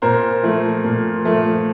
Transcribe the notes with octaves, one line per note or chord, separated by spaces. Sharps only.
A#2 A#4 C5
F3 A3
A#2
F3 A3